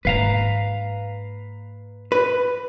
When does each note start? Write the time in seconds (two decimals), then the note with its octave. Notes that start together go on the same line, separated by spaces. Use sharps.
0.05 G#2 A#3 B4 F5 A#5
2.12 B4